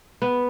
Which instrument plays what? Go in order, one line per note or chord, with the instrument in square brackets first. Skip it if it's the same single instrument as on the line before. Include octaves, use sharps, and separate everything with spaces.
[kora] B3